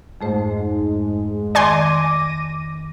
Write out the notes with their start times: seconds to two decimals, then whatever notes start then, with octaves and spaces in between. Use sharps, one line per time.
0.21 F2 G#2 G#3 A3 C5
1.55 D#3 D5 G#5 C6 D6 A#6 D#7